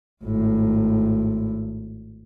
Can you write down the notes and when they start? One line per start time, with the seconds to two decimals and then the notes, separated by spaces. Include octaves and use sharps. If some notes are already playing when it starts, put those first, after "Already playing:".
0.24 G#1 A2